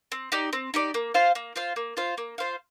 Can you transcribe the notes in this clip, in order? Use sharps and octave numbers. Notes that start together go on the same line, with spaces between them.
C4
D#4 G4 D5
C4
D#4 G4 D5
A#3
F4 C5 F5
A#3
F4 C5 F5
A#3
F4 C5 F5
A#3
F4 C5 F5